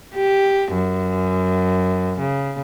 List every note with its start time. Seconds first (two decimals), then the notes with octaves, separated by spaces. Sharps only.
0.15 G4
0.73 F#2
2.19 C#3